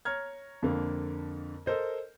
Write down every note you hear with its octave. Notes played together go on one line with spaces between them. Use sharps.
C#5 A#5 F6 G#6
F2 D3 A#3
A4 A#4 C5 D#5